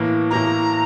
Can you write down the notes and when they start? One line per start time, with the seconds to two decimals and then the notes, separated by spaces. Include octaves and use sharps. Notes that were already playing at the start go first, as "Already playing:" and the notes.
Already playing: A2 E3 A#3
0.31 A2 E3 A#3 A#5